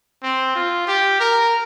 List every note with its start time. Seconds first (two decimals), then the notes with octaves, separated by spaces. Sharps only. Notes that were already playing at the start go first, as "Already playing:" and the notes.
0.23 C4
0.55 F4
0.87 G4
1.20 A#4